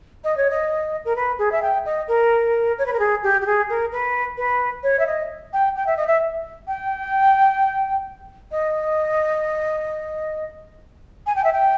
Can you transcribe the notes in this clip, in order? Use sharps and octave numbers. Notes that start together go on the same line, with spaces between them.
D#5
C#5
D#5
A#4
B4
G#4
E5
G5
D#5
A#4
C#5
B4
A#4
G#4
G4
G4
G#4
A#4
B4
B4
C#5
E5
D#5
G5
G5
E5
D#5
E5
G5
D#5
G#5
G5
E5
G5